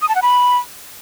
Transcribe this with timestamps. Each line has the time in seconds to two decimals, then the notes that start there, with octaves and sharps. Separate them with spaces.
0.02 D#6
0.09 A5
0.15 F#5
0.22 B5